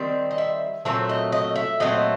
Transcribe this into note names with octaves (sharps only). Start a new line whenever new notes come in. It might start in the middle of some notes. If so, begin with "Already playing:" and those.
Already playing: D#3 G3 C4
D#5
E5
A#2 F#3 A3 C4 E5
D#5
D#5
E5
A#2 F#3 A3 C4 D#5